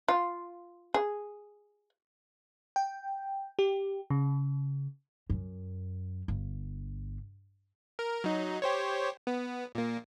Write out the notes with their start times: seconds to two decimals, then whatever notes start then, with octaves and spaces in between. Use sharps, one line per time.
0.08 F4
0.94 G#4
2.76 G5
3.59 G4
4.10 C#3
5.30 F#2
6.28 G1
7.99 A#4
8.24 F#3 D#4
8.62 G4 C5 C#5
9.27 B3
9.75 A#2 A#3